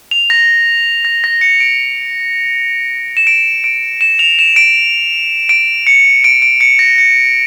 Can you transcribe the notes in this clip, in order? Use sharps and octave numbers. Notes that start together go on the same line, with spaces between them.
F7
A#6
A#6
A#6
C#7
D7
E7
D7
D7
E7
F7
E7
D7
D7
C#7
D7
D7
C#7
A#6
C#7